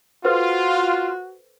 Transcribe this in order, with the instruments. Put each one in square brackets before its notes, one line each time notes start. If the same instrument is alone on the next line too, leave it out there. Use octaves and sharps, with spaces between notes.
[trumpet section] F4 [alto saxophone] F#4 [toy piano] A4 B4 C5